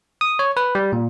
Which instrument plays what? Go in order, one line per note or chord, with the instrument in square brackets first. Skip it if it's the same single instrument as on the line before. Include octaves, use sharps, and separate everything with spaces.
[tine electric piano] D#6
C#5
B4
G3
A#2